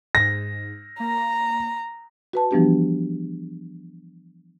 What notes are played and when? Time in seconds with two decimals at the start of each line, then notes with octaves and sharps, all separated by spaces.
0.15 G#2 A#6
1.00 A#3 A#5
2.33 F#4 B4 A5
2.51 E3 F3 G3 B3 D4 G4